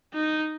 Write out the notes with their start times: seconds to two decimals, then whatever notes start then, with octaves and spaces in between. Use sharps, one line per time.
0.14 D#4